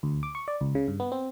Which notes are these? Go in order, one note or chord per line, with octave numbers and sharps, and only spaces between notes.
D2
D6
C#6
D5
C#2
C#3
G2
B3
C4